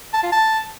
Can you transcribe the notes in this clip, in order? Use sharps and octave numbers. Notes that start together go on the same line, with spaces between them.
A5
F4
A5